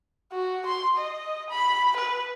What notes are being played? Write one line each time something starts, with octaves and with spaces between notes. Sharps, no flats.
F#4
C6
D#5
B5
B4